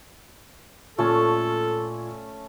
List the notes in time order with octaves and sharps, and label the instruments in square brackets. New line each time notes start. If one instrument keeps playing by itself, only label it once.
[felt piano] A#2 [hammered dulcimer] A3 C#4 [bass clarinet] A4